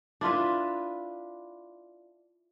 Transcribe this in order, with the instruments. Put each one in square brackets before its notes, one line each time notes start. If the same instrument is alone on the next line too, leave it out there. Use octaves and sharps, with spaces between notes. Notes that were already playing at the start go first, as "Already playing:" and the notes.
[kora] D4 E4 F4 B4